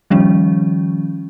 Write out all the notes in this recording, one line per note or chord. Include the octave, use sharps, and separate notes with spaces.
D#3 F3 G3 C#4